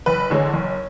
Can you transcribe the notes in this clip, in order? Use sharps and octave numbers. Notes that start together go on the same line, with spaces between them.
F#1 B4
E2 D3 G#3 C#5
F#1